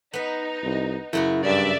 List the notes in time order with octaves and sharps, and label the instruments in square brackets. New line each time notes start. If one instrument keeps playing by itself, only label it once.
[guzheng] B3 B4 [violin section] D#4
[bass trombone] C2
[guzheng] F#2 C#3 F#4 [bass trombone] E4
[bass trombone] G2 [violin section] D5 E5